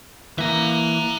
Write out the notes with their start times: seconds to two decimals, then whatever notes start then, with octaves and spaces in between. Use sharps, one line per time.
0.39 E3 A#3 E5 A#5